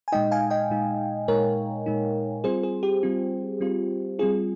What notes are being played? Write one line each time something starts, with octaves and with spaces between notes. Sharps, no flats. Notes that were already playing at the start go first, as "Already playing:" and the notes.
G#5
A#2 G#3 D#4 D#5 G5
F5 G#5
D#5 G5
A#2 G#3 D#4
A#2 G#3 D#4 A#4 C#5
A#2 G#3 D#4
G3 C4 F4 G#4 C5
G#4
G4
G3 C4 F4
G3 C4 F4
G3 C4 F4 G#4